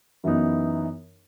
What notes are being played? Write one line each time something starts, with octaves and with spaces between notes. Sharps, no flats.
F#2 E3 B3 D#4